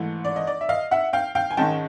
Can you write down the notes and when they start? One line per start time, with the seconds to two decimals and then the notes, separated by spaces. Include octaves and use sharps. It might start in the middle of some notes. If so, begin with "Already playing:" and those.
Already playing: G#2 E3 A3
0.25 D5
0.36 D#5
0.47 D5
0.61 E5
0.69 D#5 F5
0.91 E5 F#5
1.13 F5 G5
1.35 F5 G5
1.51 G#5
1.57 G#2 D#3 G#3 C#4 G5 A5